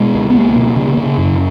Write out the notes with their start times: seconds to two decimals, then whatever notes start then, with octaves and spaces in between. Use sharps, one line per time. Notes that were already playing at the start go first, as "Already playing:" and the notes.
Already playing: B2 G#3
0.14 C#2
0.30 B3
0.35 C#2 A#3
0.55 B2
0.76 C#3
0.97 C#3
1.17 F#2